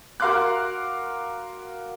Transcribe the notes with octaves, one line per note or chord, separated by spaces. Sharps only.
F#4 A#4 F5 C6 D6 F#6